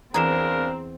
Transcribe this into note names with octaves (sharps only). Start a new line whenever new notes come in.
E2 C#3 C4 D4 G#4 A#4 A#5 E7